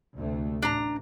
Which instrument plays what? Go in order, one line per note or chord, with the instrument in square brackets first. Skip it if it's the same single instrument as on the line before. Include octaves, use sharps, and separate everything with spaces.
[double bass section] D2 C3 A3
[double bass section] A1 [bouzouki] D4 A#5